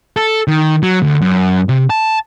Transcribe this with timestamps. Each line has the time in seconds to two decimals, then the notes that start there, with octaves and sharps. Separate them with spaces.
0.16 A4
0.48 D#3
0.83 F#3
1.02 D2
1.21 F#2
1.69 C3
1.90 A5